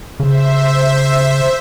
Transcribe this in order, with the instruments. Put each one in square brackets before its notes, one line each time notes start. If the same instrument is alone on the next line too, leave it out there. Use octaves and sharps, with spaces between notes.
[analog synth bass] C#3 [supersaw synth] C5 E5